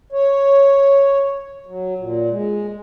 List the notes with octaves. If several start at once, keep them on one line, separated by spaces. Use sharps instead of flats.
C#5
F#3
A#2
G#3